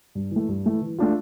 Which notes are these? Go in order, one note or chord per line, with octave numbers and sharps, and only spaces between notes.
G2
E3 A3
G2
E3 A3
E3
A3 D4 F4